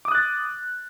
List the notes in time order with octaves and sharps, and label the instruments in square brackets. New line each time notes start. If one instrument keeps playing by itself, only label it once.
[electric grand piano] D6
D#6
F#6
A6